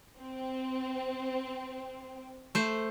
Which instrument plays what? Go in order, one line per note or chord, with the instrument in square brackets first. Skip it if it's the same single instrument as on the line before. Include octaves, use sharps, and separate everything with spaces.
[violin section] C4
[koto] A3 C5